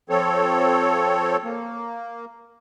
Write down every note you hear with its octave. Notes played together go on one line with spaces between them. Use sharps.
F3 C4 A4 C#5
A#3